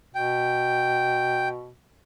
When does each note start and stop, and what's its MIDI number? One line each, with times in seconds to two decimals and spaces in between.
0.15 1.71 47
0.15 1.48 79